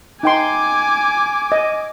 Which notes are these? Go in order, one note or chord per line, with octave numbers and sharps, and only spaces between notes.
D#4 G5 G#5 C6 D6
D#5